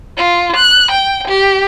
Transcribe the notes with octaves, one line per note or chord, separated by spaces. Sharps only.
F4
F#6
G5
G4